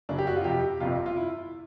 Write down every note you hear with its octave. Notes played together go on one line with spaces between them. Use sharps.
G1 F#2 C#3 D4
G4
F#4
F4
F2 C3 F3 G4
G1 F2 C3 F4
F4
E4